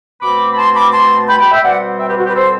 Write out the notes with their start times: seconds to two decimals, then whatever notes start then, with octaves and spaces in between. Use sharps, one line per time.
0.22 B2 A3 C4 B5 D6
0.54 B5
0.58 A5 C6
0.76 B5 D6
0.93 A5 C6
1.29 G5 B5
1.40 G5 B5
1.52 E5 G5
1.64 B2 G3 C4 D5 F#5
1.99 E5 G5
2.08 G4 B4
2.18 F#4
2.26 G4 B4
2.35 A4 C5